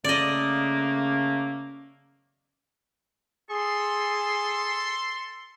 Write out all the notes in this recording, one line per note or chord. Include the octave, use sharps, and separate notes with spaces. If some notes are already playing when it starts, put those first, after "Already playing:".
C#3 A3 A#3 D5 D#5
G#4 A4 C6